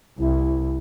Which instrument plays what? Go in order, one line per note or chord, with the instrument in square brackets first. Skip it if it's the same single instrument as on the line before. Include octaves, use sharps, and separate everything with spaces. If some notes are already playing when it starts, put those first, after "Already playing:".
[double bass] C2 [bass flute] E4